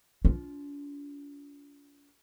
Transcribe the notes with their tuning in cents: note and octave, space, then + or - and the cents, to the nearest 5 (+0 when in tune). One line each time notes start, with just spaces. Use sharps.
D4 -45 F4 +5